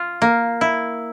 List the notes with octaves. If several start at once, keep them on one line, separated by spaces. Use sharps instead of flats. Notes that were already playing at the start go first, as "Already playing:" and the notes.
Already playing: F4
A#3
E4